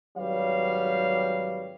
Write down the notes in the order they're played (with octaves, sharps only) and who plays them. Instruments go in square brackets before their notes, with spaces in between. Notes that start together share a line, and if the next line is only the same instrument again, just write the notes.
[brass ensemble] G#1 F#3 G3 B4 C#5 F5